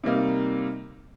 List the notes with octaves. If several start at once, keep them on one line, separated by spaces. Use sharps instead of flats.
C3 G3 A#3 D#4